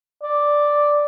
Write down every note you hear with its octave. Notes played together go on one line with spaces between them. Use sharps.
D5